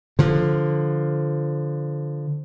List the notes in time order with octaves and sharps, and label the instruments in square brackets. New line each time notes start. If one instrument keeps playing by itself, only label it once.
[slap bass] D3 F3